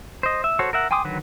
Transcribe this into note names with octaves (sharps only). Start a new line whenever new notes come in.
C5 D#5
E5
F#4 A4 C5 C#5
A#4 E5 F#5
G5 G#5 C6 D6 D#6
D3 D#3 F#3 F#4 B4